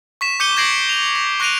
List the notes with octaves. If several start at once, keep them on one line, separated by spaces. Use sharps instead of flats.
C#6 B6 E7
D6 G6 C#7 D#7 G7
G6 G#6 A#6 C7 D7 F#7
F7
A#6
C#6 F#6 A#6 D7 D#7 F7